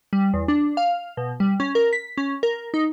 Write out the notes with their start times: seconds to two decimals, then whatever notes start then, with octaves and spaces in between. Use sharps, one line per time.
0.13 G3
0.34 E2
0.48 D4
0.77 F5
1.17 B2
1.40 G3
1.60 C#4
1.75 A#4
1.93 B6
2.18 C#4
2.43 A#4
2.74 D#4